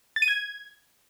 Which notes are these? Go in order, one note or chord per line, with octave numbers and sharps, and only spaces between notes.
A6
D#7
G#6